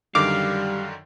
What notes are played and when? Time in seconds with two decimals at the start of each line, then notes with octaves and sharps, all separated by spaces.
0.15 F#2 D3 D#3 G3 F5 D6